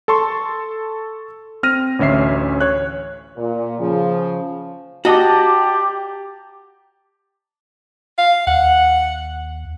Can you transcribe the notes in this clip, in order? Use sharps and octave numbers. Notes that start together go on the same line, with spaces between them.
A4 A5 C6 C#6
C4 F6 A#6 D#7
A1 D2 C#4 E5 C7
C#5 F#6
A#2
C#3 F3
F#4 G4 D5 D#5 A5 A#5
F5
D#2 F#5